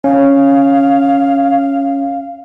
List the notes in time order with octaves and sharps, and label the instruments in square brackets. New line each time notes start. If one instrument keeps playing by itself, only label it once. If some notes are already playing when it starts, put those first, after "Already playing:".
[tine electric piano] C#4 [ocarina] F5